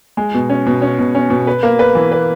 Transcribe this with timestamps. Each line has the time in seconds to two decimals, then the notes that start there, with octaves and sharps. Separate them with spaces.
0.17 G#3
0.34 B2
0.50 C#4
0.67 B2
0.82 C#4
0.99 B2
1.15 C#4
1.30 B2
1.47 B4
1.63 A#3
1.79 B4
1.95 E3
2.12 B4